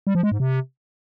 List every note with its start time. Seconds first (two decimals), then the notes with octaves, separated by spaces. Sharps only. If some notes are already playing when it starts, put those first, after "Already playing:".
0.07 G3
0.15 F3
0.23 G#3
0.32 G#2
0.40 C3